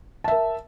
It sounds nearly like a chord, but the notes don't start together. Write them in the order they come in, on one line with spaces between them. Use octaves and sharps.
A5 E5 A#4